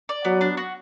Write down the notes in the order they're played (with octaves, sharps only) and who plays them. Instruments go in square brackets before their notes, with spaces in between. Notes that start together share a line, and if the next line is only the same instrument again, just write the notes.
[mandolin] D5
[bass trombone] F#3 [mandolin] B3
[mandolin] D4
F#4